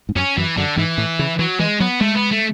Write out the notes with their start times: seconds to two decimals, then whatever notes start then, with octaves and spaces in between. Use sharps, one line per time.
0.09 G#2
0.16 F#2 C#4
0.37 F#2 E3
0.57 F#2 D3
0.77 G#2 E3
0.98 A2
1.19 C#3
1.39 E3 F#3
1.59 E3 G#3
1.80 F#3 B3
2.01 G#3 A3
2.15 B3
2.31 A3